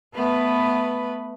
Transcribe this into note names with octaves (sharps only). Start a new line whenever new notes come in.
A3 B3 B4